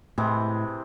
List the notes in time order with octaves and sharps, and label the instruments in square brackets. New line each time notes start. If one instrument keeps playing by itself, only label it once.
[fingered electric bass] A2 [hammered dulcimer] C3 E3 G#3